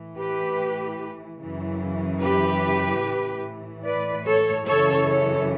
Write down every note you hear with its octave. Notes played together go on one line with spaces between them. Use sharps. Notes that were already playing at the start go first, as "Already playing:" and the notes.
Already playing: A2 E3
G4 B4
F#2 C#3 E3
G4 B4
A2 E3
B4 D5
A4 C#5
F#2 C#3 E3 A4 C#5
A4 C#5